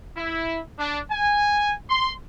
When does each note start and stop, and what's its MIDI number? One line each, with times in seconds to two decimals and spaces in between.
0.17 0.59 64
0.79 0.99 62
1.11 1.73 80
1.90 2.12 84